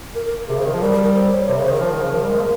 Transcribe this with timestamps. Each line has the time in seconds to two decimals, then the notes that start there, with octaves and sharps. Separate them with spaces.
0.15 A#4
0.26 A#4
0.48 C3 G#4
0.57 C#3
0.60 C5
0.66 D#3 A#4
0.73 F3
0.82 G3 A#4
0.92 A#4
1.03 A#4
1.15 C5
1.32 C#5
1.47 C3 C5
1.56 A#4
1.59 C#3
1.65 C5
1.69 D#3
1.73 A#4
1.81 F3
1.92 D#3
2.03 C#3
2.14 F3
2.23 G3
2.30 G#3
2.39 A#3